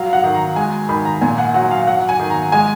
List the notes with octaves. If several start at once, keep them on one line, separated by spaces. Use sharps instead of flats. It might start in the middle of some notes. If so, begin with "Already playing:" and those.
Already playing: F#3 F5
F#5
D#3
A#5
G#3 G#5
D#3 B5
A#5
A#2 G#5
F#5
F#3 F#5
F5
F#3 F#5
G#5
D#3
A#5
G#3 G#5